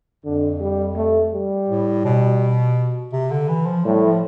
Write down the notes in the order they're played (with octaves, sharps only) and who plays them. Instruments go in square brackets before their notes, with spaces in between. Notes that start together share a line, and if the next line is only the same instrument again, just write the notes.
[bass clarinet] F2 [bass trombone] D3
[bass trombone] G3
A3
G3
[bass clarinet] A2
B2
C3
D3
E3
F3
[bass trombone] A2 [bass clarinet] G3
[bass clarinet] F3